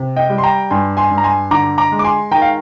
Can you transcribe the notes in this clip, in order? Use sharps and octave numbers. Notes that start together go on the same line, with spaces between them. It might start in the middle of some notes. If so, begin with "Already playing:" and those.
Already playing: C3
D#5 G5
G3
C6
G5 A#5
G2 G#5 C6
G#5 C6
G2
A#5
G#5 C6
D3 A#5 D6
A#5 D6
G#3
D6
G#5 C6
D#3 G5 A#5
F5